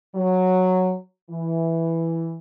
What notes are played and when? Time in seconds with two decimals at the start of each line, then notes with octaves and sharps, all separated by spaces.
0.15 F#3
1.30 E3